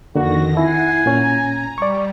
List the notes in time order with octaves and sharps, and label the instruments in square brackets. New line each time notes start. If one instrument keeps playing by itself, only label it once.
[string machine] F2 D#3 A#6 [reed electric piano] D3 A#3 [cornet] F#4
[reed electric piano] E4 [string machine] F#5 C7 [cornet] G#5
[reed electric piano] A#2 C#4 [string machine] A#5
[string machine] G3 [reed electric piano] D5 C#6